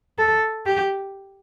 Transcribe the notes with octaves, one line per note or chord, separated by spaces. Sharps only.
A4
G4